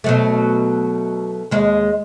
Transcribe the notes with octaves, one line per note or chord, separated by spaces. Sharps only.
B2 F#3 A3
D#2 G#3